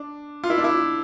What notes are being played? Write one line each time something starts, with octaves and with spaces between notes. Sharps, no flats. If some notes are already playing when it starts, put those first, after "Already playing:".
Already playing: D4
F4
E4
D4
E4